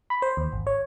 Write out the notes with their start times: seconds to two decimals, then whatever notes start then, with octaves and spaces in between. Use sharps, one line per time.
0.10 B5
0.22 C5
0.37 D#2
0.52 G#1
0.67 C#5